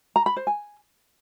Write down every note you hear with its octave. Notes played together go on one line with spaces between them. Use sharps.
A#5
B5
C5
G#5